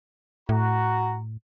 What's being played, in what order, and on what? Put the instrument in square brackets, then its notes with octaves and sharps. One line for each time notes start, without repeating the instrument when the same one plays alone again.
[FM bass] A2 [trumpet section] F#4 A#5